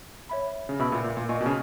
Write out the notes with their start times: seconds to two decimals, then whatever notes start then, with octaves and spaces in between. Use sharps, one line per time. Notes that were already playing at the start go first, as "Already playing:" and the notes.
0.29 C#5 E5 B5
0.69 C#3
0.79 B2 B4 E5 B5 E6
0.92 A#2
1.04 A#2
1.17 A#2
1.29 A#2 D#5 G#5 C#6
1.41 B2
1.46 C#3